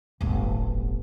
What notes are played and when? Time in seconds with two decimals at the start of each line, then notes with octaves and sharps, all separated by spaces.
0.21 D1 G1